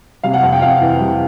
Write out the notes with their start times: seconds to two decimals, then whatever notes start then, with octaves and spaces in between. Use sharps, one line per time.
0.23 C3 F5
0.33 F#5
0.42 F2 F5
0.53 G5
0.62 F2 F5
0.81 E3
1.00 C3